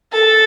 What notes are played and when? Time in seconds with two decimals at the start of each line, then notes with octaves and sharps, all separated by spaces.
0.12 A4